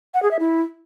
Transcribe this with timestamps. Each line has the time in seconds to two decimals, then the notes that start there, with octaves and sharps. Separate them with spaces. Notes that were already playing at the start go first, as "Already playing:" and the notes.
0.14 F#5
0.23 G#4
0.31 E5
0.40 E4